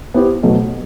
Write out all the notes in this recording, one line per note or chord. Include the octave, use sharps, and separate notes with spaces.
B3 E4 G4 C5
B2 F#3 A3